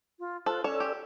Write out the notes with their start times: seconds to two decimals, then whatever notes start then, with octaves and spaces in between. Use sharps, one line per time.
0.19 F4
0.46 F4 A4 C5 F#6
0.64 C#4 A4 C#5 D5 E6
0.80 G4